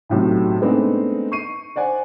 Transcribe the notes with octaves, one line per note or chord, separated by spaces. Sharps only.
B1 A2 C3 F#3
G#3 A3 B3 C4 D4 D#4
C#6 C7 D#7
C5 D5 F#5 G#5